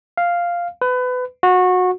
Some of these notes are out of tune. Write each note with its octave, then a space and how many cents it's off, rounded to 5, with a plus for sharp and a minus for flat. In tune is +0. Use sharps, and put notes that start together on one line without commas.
F5 -5
B4 +25
F#4 -20